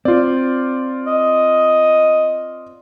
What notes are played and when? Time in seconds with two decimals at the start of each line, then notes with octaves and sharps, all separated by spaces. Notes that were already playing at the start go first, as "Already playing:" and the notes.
0.05 C4 F4 D5
1.07 D#5